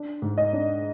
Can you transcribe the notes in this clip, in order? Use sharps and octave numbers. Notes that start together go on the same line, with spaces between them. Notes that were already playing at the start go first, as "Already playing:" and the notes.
Already playing: D4
G#2
D#5
D4